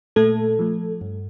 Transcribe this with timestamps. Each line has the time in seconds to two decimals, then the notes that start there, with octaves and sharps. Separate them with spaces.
0.16 A#2 A3 A4
0.59 F3 A3
1.01 G2